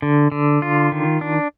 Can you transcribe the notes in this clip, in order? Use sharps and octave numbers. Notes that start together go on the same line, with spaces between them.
D3
D3
F4
D#3
D4